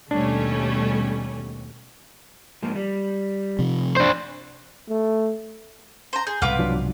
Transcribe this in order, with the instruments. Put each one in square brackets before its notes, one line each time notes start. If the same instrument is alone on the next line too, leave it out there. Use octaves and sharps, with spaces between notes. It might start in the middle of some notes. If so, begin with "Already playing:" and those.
[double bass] D#2 B2 [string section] G3 A3 C#4 [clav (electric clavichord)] D4
[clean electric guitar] G#2 F3 A#3
G3
[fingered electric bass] C3 F3
[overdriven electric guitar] D4 C5
[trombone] A3
[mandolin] C5 A#5
[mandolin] G#4 [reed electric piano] G6
[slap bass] C2 G#2 B2 [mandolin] F4 B4 D6 [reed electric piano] F#5
[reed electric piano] F3 F#3 D4